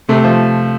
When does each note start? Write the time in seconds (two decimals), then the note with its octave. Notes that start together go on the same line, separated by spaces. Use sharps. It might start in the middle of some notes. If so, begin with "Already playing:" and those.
0.09 C3 A3
0.24 F3